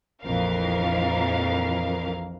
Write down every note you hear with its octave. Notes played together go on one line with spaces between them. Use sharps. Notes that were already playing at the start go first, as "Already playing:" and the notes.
A#1 F2 E3 A#4 F5